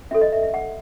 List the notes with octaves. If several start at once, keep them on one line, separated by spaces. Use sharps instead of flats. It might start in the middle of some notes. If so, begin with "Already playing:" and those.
C#4 F#4 A4 C#5 E5
D#5
E5
E5
F#5